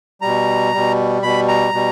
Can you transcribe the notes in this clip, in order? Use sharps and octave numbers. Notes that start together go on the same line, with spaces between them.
B2 G3 A#5
B2 G3
B2 G3 B5
A#5
B2 G3